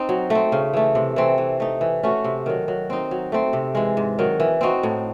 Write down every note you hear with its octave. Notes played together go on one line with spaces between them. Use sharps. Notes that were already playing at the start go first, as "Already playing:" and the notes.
Already playing: C4 D#4
F#3
A3 C4
C#3
E3 A3
C3
E3 A3 C4
E3
A3 D#4
E3
A3 C#4 F#4
C3
D#3 F#3
F#3
C4 D#4
F#3
A3 C4
C3
E3 G#3
G#2
D#3 F#3
E3
C4 D#4 F#4
A2